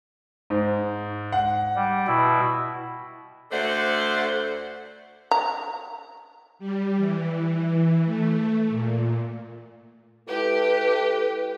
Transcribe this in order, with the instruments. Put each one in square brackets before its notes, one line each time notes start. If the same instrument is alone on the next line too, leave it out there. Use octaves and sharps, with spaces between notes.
[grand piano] G#2
F#5
[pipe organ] G3
B2 E4
[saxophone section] D2 D3 A3 C5 D5 F#5
[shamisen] A#5
[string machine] G3
E3
A3
A#2
[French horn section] G#3 E4 A4 [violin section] G4 [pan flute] B4